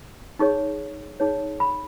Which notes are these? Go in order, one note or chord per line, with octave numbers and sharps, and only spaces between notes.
D#4 G#4 C#5 C#6
D#4 G#4 C#5
B5